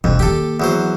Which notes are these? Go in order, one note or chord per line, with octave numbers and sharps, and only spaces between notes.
E1 F2
D#3 A#3 G4 A4
E2 F#3 C5